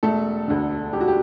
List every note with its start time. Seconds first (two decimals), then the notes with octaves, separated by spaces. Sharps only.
0.03 E1 A3 A4
0.48 D2 D3
0.93 E1 G4
1.01 F#4
1.08 G4